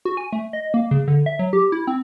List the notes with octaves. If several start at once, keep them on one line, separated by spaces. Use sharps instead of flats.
F#4
G#5
A3
D#5
A#3
C#3
D3
E5
F#3
G4
E4
C4